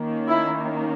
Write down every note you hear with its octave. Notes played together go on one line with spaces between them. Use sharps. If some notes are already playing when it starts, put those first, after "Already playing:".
Already playing: D#3 A#3 C#4
E4